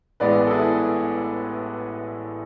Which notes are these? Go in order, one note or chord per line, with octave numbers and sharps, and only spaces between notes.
A1 A2 G#3 B3 B4 D5
A4
E4 G#4